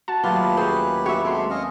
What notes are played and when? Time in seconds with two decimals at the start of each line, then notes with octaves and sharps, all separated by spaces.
0.08 F#4 A5
0.24 D#2 A2 F#3 F4 G4 B4
0.57 C#4 G#4 C5
1.06 F#4 C#5 E5
1.23 G#3 C4 A4 C6
1.50 C#4 D#5 F5